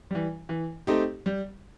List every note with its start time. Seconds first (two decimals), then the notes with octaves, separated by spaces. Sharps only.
0.11 E3 G3
0.49 E3
0.87 A3 C4 D#4 G4
1.26 G3